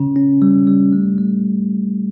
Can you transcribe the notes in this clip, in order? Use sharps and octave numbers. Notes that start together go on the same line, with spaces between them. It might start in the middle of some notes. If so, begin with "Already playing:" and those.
Already playing: C#3 C#4
C#4
G3
G3
A3
A3